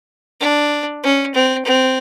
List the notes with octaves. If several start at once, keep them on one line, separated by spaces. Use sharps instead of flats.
D4
C#4
C4
C4